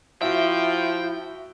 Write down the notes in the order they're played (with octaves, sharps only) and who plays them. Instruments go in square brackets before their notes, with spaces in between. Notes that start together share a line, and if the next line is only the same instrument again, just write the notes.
[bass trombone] F3 [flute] E4 [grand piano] F#4 E5 [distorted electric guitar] G5